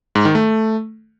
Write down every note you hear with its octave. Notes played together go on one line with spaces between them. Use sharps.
G#2
D#3
A3